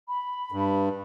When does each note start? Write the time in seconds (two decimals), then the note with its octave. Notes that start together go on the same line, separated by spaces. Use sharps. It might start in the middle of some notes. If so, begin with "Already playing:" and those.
0.08 B5
0.52 G2